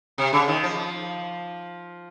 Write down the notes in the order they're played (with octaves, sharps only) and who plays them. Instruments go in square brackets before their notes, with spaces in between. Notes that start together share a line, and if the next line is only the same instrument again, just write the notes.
[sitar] C3
C#3
D#3
F3